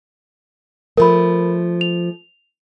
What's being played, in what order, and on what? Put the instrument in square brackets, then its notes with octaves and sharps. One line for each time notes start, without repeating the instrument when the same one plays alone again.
[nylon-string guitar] F3 A3 [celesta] A#4 B5
[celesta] F7